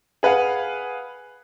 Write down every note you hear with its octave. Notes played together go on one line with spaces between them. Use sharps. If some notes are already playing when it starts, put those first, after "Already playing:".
G#4 B4 F5 F#5